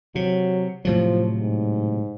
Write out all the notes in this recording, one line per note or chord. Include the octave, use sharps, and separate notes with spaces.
C3 F#3
A2 C3 F3 F#3
G#2